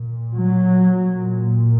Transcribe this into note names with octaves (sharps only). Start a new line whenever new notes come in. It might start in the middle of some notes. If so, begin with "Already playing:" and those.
Already playing: A#2
F#3
A#2